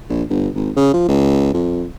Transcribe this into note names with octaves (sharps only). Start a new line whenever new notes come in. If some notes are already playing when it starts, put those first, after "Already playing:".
A#1
G1
G#1
C#3
F3
C#2
F2